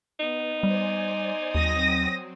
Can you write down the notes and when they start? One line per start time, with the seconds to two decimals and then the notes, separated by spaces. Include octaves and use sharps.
0.20 B3 D#4
0.63 G3 C5 D5 G#5
1.55 D#2 F#3 C4 D#6 A#6